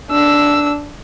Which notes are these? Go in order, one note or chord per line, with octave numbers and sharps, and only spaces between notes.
D4 E6